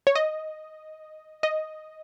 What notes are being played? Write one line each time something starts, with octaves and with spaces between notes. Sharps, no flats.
C#5
D#5
D#5